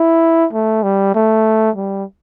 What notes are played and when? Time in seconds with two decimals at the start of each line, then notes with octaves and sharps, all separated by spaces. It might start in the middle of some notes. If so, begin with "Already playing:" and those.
Already playing: E4
0.53 A3
0.83 G3
1.15 A3
1.76 G3